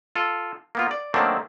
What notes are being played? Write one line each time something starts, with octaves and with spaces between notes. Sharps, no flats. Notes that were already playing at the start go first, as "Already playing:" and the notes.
F4 A4
A#3 B3 F4
D5
D#3 F#3 A3 A#3 C4 D4